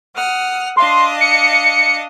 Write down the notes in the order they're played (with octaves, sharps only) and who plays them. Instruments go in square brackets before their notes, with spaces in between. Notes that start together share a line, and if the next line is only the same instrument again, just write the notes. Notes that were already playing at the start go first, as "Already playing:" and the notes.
[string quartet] F#5 D#6 F6
[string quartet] D4 D#5 F5 [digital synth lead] C6
[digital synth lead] C#7